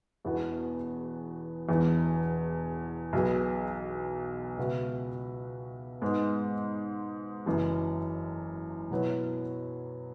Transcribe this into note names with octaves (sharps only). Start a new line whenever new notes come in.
E1 E2 E3 B3 F#4
E1 E2 E3
B1 B2 B3 G#4
C#2 B2 B3 F#4 E5
G#2 G#3 B3
F#1 F#2 E3
B2 F#3 B3 E4 C#5